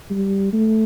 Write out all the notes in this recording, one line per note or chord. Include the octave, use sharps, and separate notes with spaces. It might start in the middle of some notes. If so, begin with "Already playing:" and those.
G3
A3